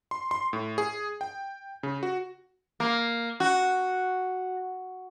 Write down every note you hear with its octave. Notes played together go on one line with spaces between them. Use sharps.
C6
C6
A2
G#4
G5
C#3
F#4
A#3
F#4